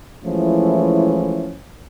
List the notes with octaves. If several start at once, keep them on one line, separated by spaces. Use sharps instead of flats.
E3 F3 G#3 A3 C#4 E4